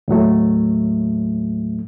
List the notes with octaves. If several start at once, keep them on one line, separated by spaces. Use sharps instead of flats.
D#2 A2 F#3 A3